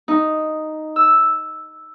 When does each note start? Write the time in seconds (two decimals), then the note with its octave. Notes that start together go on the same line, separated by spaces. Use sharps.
0.08 D#4
0.96 E6